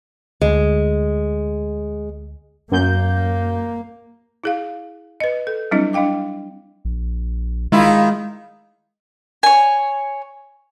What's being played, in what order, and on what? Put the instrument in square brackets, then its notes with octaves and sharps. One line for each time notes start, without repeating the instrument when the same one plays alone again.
[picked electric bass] D2 [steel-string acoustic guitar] G#3
[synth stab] F#2 G6 [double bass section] A#3
[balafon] E4 G#4 F5
B4 D#5
A4
F#3 G3 C4 D4 E4 D#5
D4 D#5 F5 G5 D6
[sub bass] A#1
[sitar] D#3 E4 F4 [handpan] G#3
[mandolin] C#5 G#5